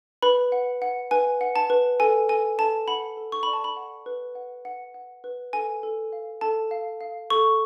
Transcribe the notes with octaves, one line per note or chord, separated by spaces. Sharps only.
B4 B5
F#5
F#5
B4 G#5
F#5
A5
B4
A4 G#5
A4 G#5
A4 A5
F#5 B5
A4
C#6
D5 B5
A5
B5
F#5
B4
F#5
F#5
F#5
B4
A4 G#5
A4
F5
A4 A5
F5
F5
A4 C#6